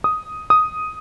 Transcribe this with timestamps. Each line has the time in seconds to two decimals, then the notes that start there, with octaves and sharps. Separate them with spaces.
0.04 D#6
0.50 D#6